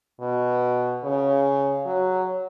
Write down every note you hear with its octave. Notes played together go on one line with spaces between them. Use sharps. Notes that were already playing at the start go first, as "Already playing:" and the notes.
B2
C#3
F#3